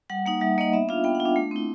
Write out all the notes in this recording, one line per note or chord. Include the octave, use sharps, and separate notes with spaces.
G3 F#5
A#3 D#4 F#5
G3 E5
A#3 D#4 D#5
B3 E5
D4 F4 F5
B3 G5
F#5
F4
D4
A3
C4 E4